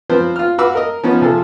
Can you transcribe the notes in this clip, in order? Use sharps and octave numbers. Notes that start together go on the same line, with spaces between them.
F3 C4 B4 C5
F4 F6
F#4 B4 F5 B5 D6 E6
A#4 D#5
F3 B3 C#4 D#4
C3 F3 G#4 A4